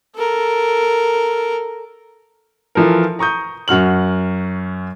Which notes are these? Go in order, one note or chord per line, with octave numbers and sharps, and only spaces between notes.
A4 A#4
E3 F3 A4 A#4
A#5 C#6 D#6 G6
F#2 F#4 F6 F#7